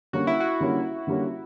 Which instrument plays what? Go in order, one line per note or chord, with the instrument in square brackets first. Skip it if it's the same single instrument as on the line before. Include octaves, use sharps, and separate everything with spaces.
[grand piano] D3 G3 A#3 C#4 [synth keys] F#4
[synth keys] E4
F#4
[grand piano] D3 G3 A#3 C#4
D3 G3 A#3 C#4